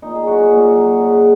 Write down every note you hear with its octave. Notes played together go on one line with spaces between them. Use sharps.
A#2 D#4
G#4
F#3 F#4
F#4
A#2
F#3
C#3